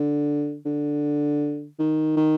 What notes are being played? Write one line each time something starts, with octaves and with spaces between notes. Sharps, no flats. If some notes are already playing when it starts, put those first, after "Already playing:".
Already playing: D3
D3
D#3
D#3